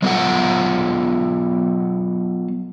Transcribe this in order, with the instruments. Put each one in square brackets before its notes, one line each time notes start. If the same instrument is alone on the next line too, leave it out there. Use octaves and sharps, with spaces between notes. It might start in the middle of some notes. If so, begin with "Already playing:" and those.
[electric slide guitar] F#3 B3 F4 G#4 A4 F#5